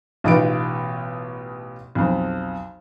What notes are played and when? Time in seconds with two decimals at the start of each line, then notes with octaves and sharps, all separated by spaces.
0.24 A1 B2 D#4 F4 B4 D7
1.95 B1 F2